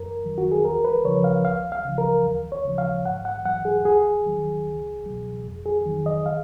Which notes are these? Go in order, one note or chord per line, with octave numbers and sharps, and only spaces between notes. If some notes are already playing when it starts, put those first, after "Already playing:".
Already playing: F#2 A#4
D#3 F#3
F#4
G#4
D#2 A#4
B4
C#3 F3 C#5
F5
C#2 F5
F5
C#3 F3
A#4
D#2
C#5
C#3 F3
F5
G#2 F#5
F#5
F#3 F#5
G#4
D#2 G#4
D#3 F#3
C#2
B2 F#3
F2
G#4
D#3 F#3
D#5
F5